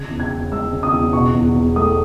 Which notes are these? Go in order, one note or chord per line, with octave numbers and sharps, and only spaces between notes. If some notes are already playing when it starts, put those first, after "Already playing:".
Already playing: C#3 G#6
E2
G#6
E2
G#3 E6
C#3
D#6
E2
B2 C#6
E2
E2
A3 D#6